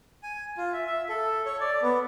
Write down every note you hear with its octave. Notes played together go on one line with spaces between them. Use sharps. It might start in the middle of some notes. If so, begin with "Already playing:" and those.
G#5
F4
E5
E5
A4
C#5
D5
B3